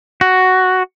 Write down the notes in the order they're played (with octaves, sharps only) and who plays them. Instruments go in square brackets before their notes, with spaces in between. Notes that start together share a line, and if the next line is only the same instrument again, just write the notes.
[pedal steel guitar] F#4